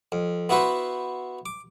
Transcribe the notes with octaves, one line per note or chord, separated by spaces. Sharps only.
F2
B3 E4 F#4 B4 C5
D6